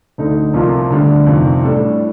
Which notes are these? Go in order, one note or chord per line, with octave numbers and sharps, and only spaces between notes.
D2 D3 A3 D#4
C2 C3 F3 A#3 F4
D2 D3 G3 D4
F2 C3 D#3
A2 G3 D4 A4